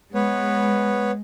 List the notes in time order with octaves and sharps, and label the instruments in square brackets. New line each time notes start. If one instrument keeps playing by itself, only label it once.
[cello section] G#3 [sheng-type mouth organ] B3 B4 C#5